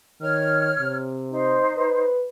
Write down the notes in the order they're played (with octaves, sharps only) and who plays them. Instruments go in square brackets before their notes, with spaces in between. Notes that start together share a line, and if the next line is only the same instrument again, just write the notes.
[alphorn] D#3 [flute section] C#5 F6
[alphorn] C3
[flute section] D#4 C5
[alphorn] B4